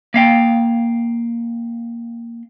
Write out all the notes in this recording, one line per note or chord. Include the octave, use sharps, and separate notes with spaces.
A#3 F5 G5